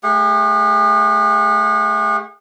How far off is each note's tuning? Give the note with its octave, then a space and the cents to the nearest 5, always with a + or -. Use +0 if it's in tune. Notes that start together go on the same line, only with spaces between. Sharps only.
A3 -15 G#4 -45 F#5 -35